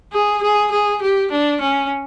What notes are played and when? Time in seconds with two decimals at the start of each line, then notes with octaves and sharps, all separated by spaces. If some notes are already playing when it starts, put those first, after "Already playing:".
0.13 G#4
0.43 G#4
0.72 G#4
1.02 G4
1.31 D4
1.61 C#4